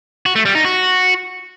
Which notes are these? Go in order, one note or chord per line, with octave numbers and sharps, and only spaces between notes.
F#4
A3
G3
D#4
F#4